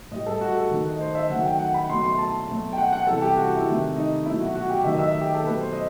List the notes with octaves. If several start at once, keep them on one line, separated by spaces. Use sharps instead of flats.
A2 G3 D#5
A4
F#4
A4
D#3 A3
D#5
C5
E5
D#3 F#3 A3 F#5
G5
F#5
B5
B2 F#3 A3 C6
C6
A5
B2 F#3 A3
G5
F#5
F#5
C3 E3 G3 A4
G4
F#4
E4
C3 D#3 A3
D#4
B2 F#3 A3 E4
F#4
F#4
G4
D#3 F#3 A3 E5
D#5
E5
G4
A4
B2 F#3 A3 B4
C5
D#5